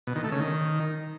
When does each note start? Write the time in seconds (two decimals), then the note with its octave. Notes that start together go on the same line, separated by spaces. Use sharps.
0.07 B2
0.15 D#3
0.24 A3
0.32 C#3
0.40 D#3